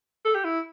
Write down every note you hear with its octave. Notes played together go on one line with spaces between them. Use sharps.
A4
G4
E4